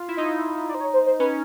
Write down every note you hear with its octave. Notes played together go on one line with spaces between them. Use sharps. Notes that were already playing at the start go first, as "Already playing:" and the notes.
Already playing: F4
E4
D#4 D#5
D5
C5
C#5
C5
C5
C#4 B4